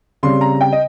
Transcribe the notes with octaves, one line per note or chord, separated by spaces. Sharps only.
C#3 G3 C4 C6
A#5
G5
D#5